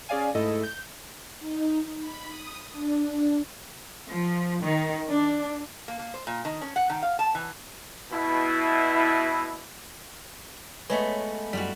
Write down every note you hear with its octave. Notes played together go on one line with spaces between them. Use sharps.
C#4 G#4 D5 F5 G#5
G#2 A3 E4 A4 D#5
G6
D#4
B5
D#6
D4
F3
D#3
D4
A#3
A#3
C5
A#2
D#3
C#4
F#5
D#3
F5
A5
E3
B2 E4
G#3 A3 B3 B4 C#5
F#2 G3 F4 F#4 B6